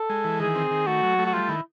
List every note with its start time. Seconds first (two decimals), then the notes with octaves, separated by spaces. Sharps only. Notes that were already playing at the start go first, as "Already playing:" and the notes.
Already playing: A4
0.10 G#3
0.24 E3
0.40 D#3 G#4
0.55 C4
0.71 D#3
0.87 A3 F#4
1.03 F#3
1.19 A3
1.26 F#4
1.33 G3 F4
1.49 D#3 E4